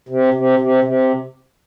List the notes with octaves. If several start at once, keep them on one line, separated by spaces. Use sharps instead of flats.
C3
C3
C3
C3